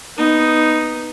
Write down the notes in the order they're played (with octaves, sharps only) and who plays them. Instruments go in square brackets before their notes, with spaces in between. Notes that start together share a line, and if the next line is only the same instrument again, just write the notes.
[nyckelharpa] B3 D#4